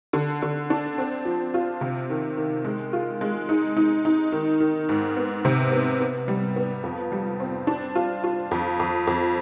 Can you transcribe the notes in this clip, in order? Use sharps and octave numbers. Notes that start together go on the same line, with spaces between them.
D3
D3
D4
C4
F3
F4
C3
D#3
D#3
G#3
F4
G#3
D#4
D#4
D#4
D#3
D#3
G#2
B3
C3
B3
B3
G3
B3
F2
G3
C4
D4
F4
F4
F2
F2
F2